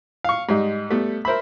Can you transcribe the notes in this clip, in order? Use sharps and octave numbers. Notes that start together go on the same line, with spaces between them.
F5 C#6
G#2 G3 D#4
G3 A3 B3
A#4 C5 E5 B5